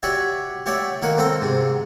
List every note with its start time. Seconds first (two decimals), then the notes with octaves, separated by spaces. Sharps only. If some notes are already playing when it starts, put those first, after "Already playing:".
0.03 F#4 G4 C#5 D5 E5
0.66 G4 C#5 D5 E5 F#5 G5
1.02 D#3 A#3 A#4 F#5
1.18 C4 A4 C5 G5 A#5
1.41 G#2 C3